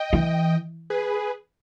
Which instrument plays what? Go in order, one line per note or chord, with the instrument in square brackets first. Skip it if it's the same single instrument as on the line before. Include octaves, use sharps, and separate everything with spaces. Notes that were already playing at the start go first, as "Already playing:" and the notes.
Already playing: [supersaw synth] D#5 G5
[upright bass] E3
[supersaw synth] G#4 B4